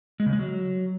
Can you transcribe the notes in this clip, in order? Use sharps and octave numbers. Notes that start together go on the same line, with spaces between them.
G#3
C#3
G#3
F#3